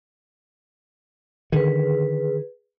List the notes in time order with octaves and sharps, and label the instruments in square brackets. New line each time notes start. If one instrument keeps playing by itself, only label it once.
[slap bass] D3 D#3 [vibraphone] G#4 B4